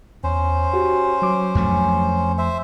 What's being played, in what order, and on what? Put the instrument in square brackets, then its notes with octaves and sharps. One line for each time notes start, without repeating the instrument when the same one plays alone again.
[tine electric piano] E2 [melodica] C#4 C5
[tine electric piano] F#4 G4
F#3 D6
[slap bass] F2 F3 A3
[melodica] C5 E5